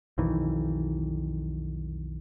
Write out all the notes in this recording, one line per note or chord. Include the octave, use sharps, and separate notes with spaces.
B1 F2 D#3 E3